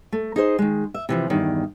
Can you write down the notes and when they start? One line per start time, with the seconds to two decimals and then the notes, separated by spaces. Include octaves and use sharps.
0.12 A3
0.36 D#4 G#4 C5 D#5
0.59 D#3 G#3
0.94 E5
1.09 C3 E3 F3
1.30 E2 G2 D#3